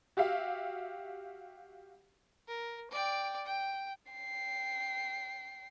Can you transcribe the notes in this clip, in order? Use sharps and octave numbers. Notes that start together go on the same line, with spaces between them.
F#4 G4 E5 F5
A#4
D5 G5
G5
G5 C7